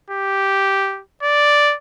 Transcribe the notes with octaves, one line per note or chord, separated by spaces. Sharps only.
G4
D5